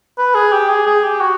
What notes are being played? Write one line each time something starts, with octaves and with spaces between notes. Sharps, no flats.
B4
G#4
G4
G#4
G#4
G4
F#4